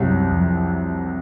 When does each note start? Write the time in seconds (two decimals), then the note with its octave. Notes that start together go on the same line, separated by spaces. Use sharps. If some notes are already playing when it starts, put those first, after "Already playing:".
Already playing: C2 F#2 C3 F#3
0.31 F2